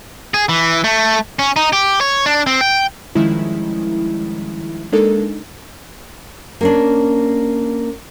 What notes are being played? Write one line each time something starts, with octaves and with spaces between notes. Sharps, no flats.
G#4
E3
A3
C#4
D#4
G4
C#5
D4
C4
G5
D#3 F3 G3 G#3 C#4 E4
G#3 A#3 D4 D#4 A4 A#4
A#3 C#4 D4